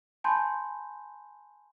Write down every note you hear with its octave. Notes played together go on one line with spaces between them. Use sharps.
G#5 A5 B5 C6 G6